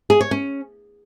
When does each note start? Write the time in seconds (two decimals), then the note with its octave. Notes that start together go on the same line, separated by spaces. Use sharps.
0.10 G#4
0.21 C#5
0.31 C#4